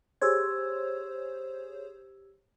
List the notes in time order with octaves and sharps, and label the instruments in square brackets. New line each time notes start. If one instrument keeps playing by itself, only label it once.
[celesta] G4 E6 G#6 [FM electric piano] G#4 C5 C#5